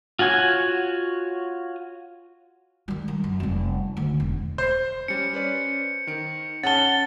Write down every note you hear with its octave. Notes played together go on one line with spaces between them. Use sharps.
F4 F#4 C#5 G#5
D#3 G3
D#3
F#2
F1 G3
D2 D#3
E1
C5 G6 C7
G3 C#4 C#7
C#4 B4 D5
D#3 D7
C#4 G#4 F#5 A5 A6 G7